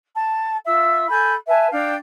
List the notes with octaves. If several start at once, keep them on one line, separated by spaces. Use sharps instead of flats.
A5
F4 E5 E6
A4 G#5 B5 G6
B4 E5 G#5 A5
D4 F5 G5